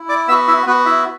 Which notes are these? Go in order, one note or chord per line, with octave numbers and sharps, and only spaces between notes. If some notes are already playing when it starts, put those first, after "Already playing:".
Already playing: E4
D5 D6
B3 F#4 E5 E6
E4 E5
B3 F#4 B4
E4 E5